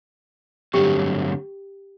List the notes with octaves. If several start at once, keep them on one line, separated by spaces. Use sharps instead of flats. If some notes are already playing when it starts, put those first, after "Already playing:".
G2 D3 F#3 A3 C4 G4 G5